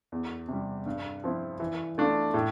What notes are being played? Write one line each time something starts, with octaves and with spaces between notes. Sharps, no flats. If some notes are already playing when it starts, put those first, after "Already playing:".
E2
C3 G3
G2
F3 C4 E4
E3
A3 D4 F4
A2